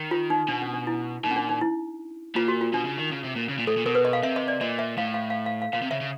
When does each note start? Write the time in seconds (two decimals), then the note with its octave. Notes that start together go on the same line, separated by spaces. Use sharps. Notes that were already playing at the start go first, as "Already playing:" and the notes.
Already playing: D#3
0.11 F4
0.30 D#4
0.49 B2 D4
0.62 C#4
0.74 D4
0.87 E4
1.24 A#2 D#4
1.31 C#4
1.36 D4
1.49 D#4
1.61 E4
2.36 A#2 F4
2.48 F#4
2.61 F4
2.73 B2 D4
2.85 C#3
2.98 D#3
3.11 C#3
3.24 C3
3.36 A#2
3.49 C#3
3.58 A#2
3.67 A2 A4
3.77 A#2
3.86 B2 A#4
3.95 B4
4.05 D#5
4.13 F5
4.23 C3 E5
4.36 D#5
4.48 D5
4.61 A#2 D#5
4.79 E5
4.97 A2 F5
5.14 F5
5.30 F5
5.46 F5
5.62 F5
5.73 A#2 F5
5.82 C3
5.91 C#3 E5
6.01 C#3